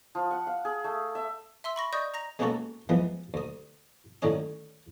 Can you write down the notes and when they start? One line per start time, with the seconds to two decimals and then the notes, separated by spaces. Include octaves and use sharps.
0.15 F3
0.31 F#5
0.47 F5
0.65 G#4
0.84 A3
1.15 E5
1.64 E5 C6 E6
1.76 B5 C#6 A#6
1.93 D5 D#5 C#6 D#6 G6 A#6
2.14 A#5 A#6 F7
2.39 G#3 A#3 B3 C#4 F#4 A4
2.89 E3 F3 G#3 B3
3.34 D2 D#6
4.22 A2 D3 D#3 C#4 D#6